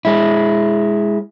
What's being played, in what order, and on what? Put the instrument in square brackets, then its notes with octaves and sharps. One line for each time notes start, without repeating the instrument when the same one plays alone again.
[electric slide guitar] G#3 E4